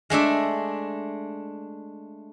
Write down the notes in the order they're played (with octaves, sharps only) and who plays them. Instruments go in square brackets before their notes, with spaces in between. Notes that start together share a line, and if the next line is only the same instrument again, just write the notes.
[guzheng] G#3 A3 D4 E5